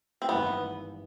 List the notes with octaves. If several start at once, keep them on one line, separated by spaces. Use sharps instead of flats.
C4
G#1 G2 E3 B3